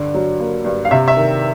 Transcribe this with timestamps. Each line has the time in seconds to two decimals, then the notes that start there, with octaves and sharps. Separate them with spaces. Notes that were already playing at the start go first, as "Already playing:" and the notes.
Already playing: G2 D3
0.14 F#3
0.40 A#3
0.65 G2
0.85 F5
0.91 C3 E5
1.08 E5
1.16 D#3